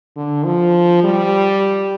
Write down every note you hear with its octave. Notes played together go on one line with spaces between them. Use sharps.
D3
F3
G3